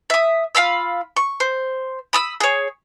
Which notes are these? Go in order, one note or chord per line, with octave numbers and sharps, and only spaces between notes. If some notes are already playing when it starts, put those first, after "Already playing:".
E5 D#6
F4 F5 B5 E6
C#6
C5
B5 D#6 E6
G#4 C#5